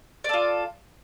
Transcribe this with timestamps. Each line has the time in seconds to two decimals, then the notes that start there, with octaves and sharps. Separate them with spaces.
0.24 D5
0.29 A4
0.34 F4